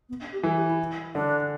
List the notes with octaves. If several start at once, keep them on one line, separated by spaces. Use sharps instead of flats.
B3
D4
G4
E3 A4
G4
E4
D3 D4